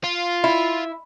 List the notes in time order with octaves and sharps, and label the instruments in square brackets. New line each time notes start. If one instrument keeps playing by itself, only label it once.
[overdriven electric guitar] F4
[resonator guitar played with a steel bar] E4